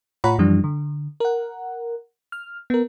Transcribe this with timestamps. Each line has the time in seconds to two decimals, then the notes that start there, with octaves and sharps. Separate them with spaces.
0.24 A2 F4 C#5 F#5 A#5 B5
0.38 F#2 E3 F3 G3 D4
0.64 D3
1.20 A#4 F#5
2.32 F6
2.70 B3 A#4